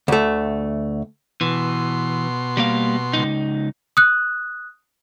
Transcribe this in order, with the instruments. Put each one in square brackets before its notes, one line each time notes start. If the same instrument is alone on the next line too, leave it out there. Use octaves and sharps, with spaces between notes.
[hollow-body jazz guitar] D2 A3
[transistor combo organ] B2 C6 [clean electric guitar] E3
[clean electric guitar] G3 A#3 F5
C#2 F#2 D#4
[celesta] D#6 F#6